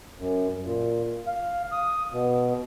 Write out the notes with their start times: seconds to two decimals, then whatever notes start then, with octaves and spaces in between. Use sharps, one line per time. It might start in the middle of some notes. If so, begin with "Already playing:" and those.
0.19 F#2
0.65 A#2
1.27 F5
1.72 D#6
2.13 B2